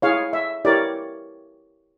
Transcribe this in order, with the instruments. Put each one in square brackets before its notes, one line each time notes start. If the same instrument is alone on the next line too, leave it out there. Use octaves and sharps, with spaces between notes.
[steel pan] E4 G#4 C#5 F5
E5
E4 G4 A#4 C#5 D5